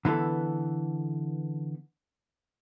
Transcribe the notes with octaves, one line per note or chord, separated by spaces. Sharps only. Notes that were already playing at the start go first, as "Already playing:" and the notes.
D3 E3 B3 A4